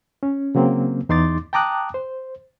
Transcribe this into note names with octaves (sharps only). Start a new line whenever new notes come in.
C#4
C#3 F#3 A#3 C4
E2 D#4 C6 D6 A6
G5 A5 A#5 D6 D#6 F#6
C5